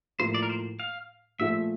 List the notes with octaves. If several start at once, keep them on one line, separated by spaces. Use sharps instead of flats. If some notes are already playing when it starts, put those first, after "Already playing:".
A2 F3 A#3 C5
D5
A#4
C5
F5
A#2 F3 A3 E5